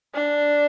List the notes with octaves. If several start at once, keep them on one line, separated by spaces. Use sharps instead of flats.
D4